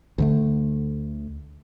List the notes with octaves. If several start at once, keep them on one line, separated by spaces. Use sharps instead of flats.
D2 D3 A3